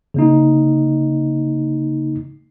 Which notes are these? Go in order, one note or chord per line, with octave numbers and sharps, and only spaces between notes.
C#3 A#3 D#4